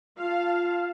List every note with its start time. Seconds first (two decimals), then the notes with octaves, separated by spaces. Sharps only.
0.18 F4 F5 A5